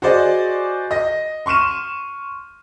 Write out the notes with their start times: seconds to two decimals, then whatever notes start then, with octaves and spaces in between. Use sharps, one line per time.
0.02 F#4 G#4 C5 D5 D#5
0.91 D#5 A#6
1.46 C6 C#6 F6 D#7 E7